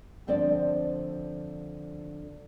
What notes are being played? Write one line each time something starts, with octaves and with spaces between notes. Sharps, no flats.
D2 D3 F3 C4 C5 D5